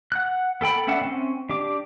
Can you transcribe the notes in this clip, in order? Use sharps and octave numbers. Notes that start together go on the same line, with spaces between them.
F#5 F#6
B3 A4 G5 B5
B3 C#4 D4 E5 F#5
C4 C#4
D4 G4 D6